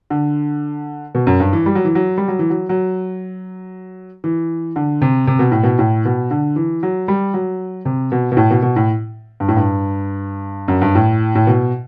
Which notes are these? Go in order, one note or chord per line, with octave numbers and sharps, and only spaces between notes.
D3
B2
F#2
G2
E3
G3
F#3
E3
F#3
G3
F#3
E3
F#3
F#3
E3
D3
C3
C3
B2
A2
B2
A2
B2
D3
E3
F#3
G3
F#3
C3
B2
B2
A2
B2
B2
A2
G2
A2
G2
F#2
G2
A2
A2
B2